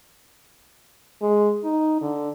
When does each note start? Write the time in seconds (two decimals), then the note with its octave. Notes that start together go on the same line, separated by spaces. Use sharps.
1.22 G#3
1.64 D#4
2.01 D3